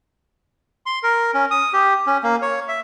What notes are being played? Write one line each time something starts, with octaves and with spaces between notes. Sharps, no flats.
C6
A#4
C#4
D#6
G4
C#4
A#3
C#5
E5